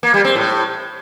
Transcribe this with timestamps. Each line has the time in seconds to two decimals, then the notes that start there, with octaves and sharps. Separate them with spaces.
0.03 A#3
0.14 G3
0.25 C4
0.35 A2